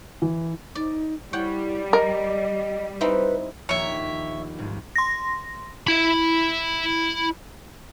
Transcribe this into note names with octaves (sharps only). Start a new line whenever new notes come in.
E3
D#4 D5
G3 E4 C#5 F#5 G5
A#4 D#5
C4 D#4 E4 B4
A#1 D#2 C#5 E5
C2 G#2 G#3
C6 A#6
E4 B5